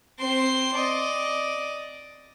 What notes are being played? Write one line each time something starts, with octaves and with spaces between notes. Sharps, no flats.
C4 C6
D5 D#5